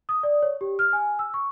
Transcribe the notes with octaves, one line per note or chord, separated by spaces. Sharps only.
D#6
D5
C#5
G4
F6
G#5
E6
C#6